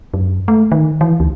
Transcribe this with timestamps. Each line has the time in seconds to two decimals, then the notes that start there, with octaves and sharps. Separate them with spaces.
0.14 F#2
0.48 A3
0.72 D#3
1.01 E3
1.20 D2